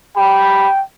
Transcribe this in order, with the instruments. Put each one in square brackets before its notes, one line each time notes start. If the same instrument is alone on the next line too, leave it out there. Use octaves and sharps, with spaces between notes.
[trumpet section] G4 A#5 B5 [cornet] G5